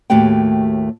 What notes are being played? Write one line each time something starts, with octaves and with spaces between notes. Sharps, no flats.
D#2 A2 A3 F#4 G4 G5